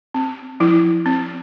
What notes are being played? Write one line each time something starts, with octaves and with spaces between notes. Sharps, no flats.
C4
F3 E4
C4